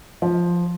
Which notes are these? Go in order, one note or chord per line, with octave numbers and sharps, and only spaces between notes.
F3